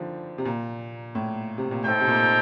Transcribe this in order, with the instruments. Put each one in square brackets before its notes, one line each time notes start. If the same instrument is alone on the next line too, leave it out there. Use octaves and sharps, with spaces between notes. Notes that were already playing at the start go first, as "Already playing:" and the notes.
Already playing: [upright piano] D3 D#3 F3
C3
A#2
A2
C3
A#2
[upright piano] A2 [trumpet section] D#4 A4 C5 G5
[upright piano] C3
A#2